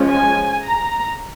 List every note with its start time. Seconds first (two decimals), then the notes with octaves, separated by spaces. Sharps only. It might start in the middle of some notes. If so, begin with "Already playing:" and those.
Already playing: F3 G#3 C#4
0.10 G#5
0.65 A#5